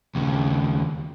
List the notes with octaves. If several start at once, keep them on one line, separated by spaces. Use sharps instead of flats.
D#2 C#3